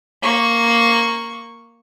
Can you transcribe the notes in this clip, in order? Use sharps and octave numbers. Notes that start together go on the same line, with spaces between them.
A#3 C#6